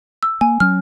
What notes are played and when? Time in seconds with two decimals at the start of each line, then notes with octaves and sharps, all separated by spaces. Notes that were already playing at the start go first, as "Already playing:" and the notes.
0.23 E6
0.41 A#3 G#5
0.60 F#3 C#4 F6